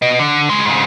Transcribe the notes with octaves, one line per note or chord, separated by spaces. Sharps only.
B3 D#5
D3
C#2 G#3
G#2 C#3